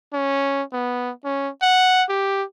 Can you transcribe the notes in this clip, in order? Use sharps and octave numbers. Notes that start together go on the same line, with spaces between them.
C#4
B3
C#4
F#5
G4